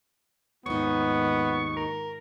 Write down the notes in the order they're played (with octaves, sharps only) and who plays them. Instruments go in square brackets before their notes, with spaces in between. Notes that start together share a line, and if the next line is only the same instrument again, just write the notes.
[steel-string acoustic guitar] D#2 D#4 [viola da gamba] G#2 D#3 F3 [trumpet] B3 [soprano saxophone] C#6
[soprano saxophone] A#4